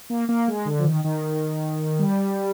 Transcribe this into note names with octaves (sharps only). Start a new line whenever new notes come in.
A#3
A#3
G#3
D3
F3
D#3
D#3
G3